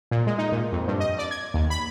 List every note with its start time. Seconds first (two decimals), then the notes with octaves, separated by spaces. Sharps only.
0.11 A#2
0.27 G#3
0.38 D#4
0.52 A#2
0.72 F2
0.88 G2
1.00 D#5
1.19 D5
1.31 G#6
1.54 D#2
1.70 B5